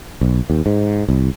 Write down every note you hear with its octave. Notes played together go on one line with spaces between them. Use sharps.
B1
D#2
G#2
C2